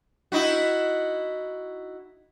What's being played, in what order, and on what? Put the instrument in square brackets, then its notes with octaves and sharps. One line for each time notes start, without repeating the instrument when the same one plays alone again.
[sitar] D#4 E4 F#4